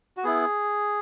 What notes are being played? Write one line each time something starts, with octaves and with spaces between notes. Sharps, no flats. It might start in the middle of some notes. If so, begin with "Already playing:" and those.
F#4
B3 E4 G#4